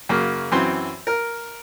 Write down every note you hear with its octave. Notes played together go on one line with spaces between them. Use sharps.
F#2 C#3 A#3
F#2 E3 C4 C6
A#4